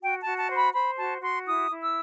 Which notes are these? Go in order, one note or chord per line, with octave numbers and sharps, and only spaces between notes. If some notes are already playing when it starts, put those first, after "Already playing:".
F#4 G5
A5
F#4
A5
C5
B5
C5 B5
F#4 A5
F#4 C6
E4 D#6
E4
E6